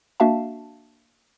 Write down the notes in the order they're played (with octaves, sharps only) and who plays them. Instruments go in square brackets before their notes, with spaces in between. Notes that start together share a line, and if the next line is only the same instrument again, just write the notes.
[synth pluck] A#3 D4 F#4 E5 F5 A5